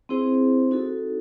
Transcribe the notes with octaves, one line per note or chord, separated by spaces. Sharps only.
C4 E4 G#4 C5
D#4 F#4 A4